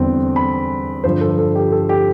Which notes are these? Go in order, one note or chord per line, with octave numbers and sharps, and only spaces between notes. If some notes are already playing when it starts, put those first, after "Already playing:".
Already playing: E2 D3 G3 C4
B5
G2 D3 F3 C5
A4
A4
G4
A4
G4